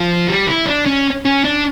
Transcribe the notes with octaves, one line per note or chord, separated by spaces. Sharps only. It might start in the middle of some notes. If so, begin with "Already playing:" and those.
Already playing: F3
G3
E4
D4
C#4
C#4
D4